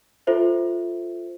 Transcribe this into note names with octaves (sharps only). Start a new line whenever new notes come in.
F4 A4 C5 E5